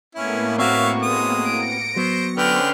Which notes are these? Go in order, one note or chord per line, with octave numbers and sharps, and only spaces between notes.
A2 A#3 B3 C#4 E4
C4 F#4 C#5 E5 F5 C#6
G#3 D#6
A#6 C#7 D7
F#3 B3 C5
D3 C#4 B4 C5 G5 F6 C7